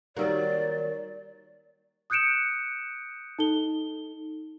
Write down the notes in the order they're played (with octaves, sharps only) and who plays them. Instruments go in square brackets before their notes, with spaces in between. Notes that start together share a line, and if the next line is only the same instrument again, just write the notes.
[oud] D#3 F#3 A#3 [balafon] G3 D#4 G4 [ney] D5
[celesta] D#6 F#6 G6 C#7 D7 E7
D#4 A4 G7